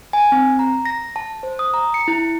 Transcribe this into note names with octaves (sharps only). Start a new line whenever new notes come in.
G#5
C4
A#5
A#6
A5
C5
D#6
A#5
C#7
E4